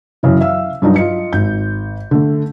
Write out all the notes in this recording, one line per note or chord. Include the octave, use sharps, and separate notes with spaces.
F#2 C#3 E3
E5 F5 E6
G2 F#3 D4 D#4
F4 D#5 C#7
G#1 G6
D3 A3